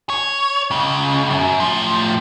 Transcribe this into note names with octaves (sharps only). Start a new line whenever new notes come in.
C#5
C#2 C#3
F#2
A2 F3